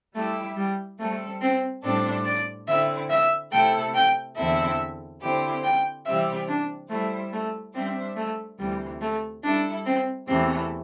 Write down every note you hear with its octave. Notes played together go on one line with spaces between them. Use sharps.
G3 A3 E4 G4 E5
G3
G3 A3 C4 A4
C4
A2 G3 C4 D4 A4 C5
D5
D3 C4 E4 E5
E5
C3 A3 E4 A4 G5
G5
E2 D3 C4 E4 A4 E5
D3 C4 E4 G4 C5
G5
C3 E3 G3 C4 G4 E5
D4
G3 A3 E4 C5 E5
A3
G3 C4 D4 C5 E5
A3
D2 C3 E3 G3
A3
G3 D4 E4 A4
C4
E2 C3 E3 A3 C4